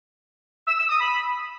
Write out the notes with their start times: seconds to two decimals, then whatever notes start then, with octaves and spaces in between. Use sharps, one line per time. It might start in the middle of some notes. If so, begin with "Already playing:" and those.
0.68 E6
0.79 E6
0.90 D#6
1.01 B5